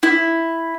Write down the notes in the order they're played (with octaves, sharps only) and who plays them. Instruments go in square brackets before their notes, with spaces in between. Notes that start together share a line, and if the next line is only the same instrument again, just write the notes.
[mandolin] E4